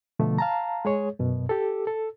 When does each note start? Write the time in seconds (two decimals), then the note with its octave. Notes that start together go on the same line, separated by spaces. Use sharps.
0.19 B2 D3 F3 A3
0.38 F5 A5 A#5
0.85 G#3 G#4 C#5
1.19 F#2 B2
1.49 G4 A4
1.87 A4